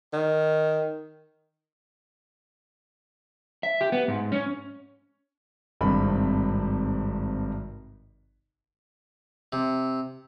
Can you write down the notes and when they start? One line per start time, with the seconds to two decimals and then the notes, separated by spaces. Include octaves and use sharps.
0.13 D#3
3.63 E5
3.81 G4
3.92 B3
4.08 G#2
4.32 C#4
5.81 G#1 G2 C3 B5
9.53 C3